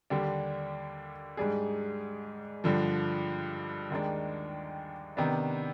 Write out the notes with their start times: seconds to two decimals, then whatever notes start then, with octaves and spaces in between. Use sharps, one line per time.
0.10 D#2 D3 G3 D4 G4
1.37 G#2 G3 D4 G#4
2.64 G2 D3 F3
3.90 D#2 D#3 G#3 D4
5.17 C3 D#3 B3 D4